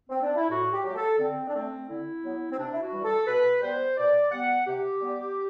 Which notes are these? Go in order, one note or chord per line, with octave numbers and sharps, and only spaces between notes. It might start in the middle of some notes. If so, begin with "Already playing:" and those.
C4
D4
E4
A2 F#4
G4
F#3 A3 G4
A4
D3 C4
D4
A3 C4
D3 E4
F#3 B3
C4
C3 D4
E4
F#4
E3 G3
A4
B2 B4
G3 B3 C5
B2 D5
G3 B3 F#5
C3 G4
G3 B3